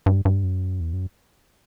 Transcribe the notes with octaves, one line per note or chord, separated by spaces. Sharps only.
G2
G2
F#2
E2
F#2